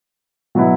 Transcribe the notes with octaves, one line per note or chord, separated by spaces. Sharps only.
B2 F#3 B3 E4